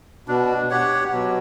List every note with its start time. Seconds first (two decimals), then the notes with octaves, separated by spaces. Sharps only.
0.28 B2 D4
0.70 G4 C#5 F#5
1.12 B2 F#3